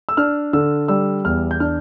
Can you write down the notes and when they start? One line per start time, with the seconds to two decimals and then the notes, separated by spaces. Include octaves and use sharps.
0.09 E6
0.17 D4 F6
0.53 D3 E6
0.88 G3 E6
1.25 E2 F6
1.51 G6
1.60 D4 F6